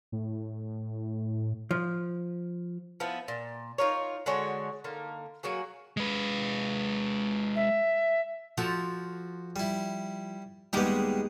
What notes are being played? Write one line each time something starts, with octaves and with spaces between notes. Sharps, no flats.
A2
F3
F3 B3 E4
A#2
D#4 F4 A#4 C#5
D3 G#3 F#4 C#5
D3 A#3 D#4
F#3 A#3 F#4 G#4
G#3 B4
E5
F3 F#4 A4
G3 E4
D#2 G3 G#3 B3 G4